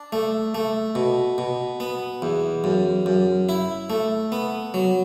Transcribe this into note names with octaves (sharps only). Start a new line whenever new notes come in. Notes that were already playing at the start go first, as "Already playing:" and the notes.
Already playing: D4
A3
A3
B2
B2
B3
E2
F#2
F#2
E4
A3
B3
F#3